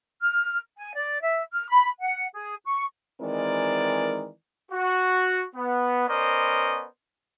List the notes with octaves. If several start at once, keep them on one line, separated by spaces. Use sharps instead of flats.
F6
G#5
D5
E5
F6
B5
F#5
G#4
C#6
D#3 E3 G#3 C4 A#4 D5
F#4
B3
B3 C#4 A#4 C5 D5 D#5